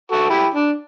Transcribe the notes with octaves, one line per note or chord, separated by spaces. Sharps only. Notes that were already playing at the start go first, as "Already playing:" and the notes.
F#4 A4
E4 G4
D4